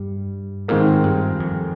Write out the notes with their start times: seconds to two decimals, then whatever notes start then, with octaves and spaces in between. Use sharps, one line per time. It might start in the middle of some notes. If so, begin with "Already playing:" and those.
Already playing: G2 G3
0.68 G#2 D#3 G#3 C4 F4 A#4
1.04 G2
1.40 F2